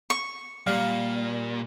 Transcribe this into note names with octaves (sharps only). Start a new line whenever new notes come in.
C#6
A#2 G3 F5